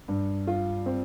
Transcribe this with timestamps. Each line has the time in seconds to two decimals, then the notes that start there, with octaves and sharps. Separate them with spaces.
0.08 G2
0.47 F4
0.86 C4